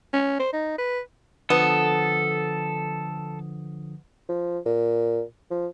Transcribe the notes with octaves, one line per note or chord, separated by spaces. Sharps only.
C#4
C5
D#4
B4
D3 F3 B3 A4 D#6
F3
A#2
F3